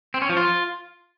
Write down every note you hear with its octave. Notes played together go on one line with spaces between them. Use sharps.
C4
C#4
F3
F4